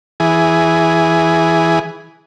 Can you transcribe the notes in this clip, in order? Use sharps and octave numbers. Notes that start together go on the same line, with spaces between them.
E3 G#4